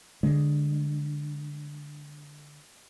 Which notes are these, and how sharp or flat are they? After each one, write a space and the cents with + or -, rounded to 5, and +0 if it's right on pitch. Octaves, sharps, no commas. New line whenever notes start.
D3 +0 G#3 +0